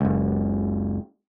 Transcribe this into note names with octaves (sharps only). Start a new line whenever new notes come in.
F#1 C#2